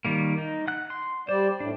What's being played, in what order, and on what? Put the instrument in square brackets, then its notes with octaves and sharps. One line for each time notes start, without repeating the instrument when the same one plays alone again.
[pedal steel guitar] D#3 G3 A#3
D#4
F#5 F#6
C6
[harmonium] G3 D5 [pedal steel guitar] C5
[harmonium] A2 [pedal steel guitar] D4